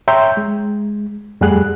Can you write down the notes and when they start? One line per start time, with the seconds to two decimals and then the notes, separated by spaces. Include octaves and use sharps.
0.08 C#5 E5 G5 A#5 C6 G6
0.37 G#3
1.41 F2 G3 A3 G#4 F#5 F#6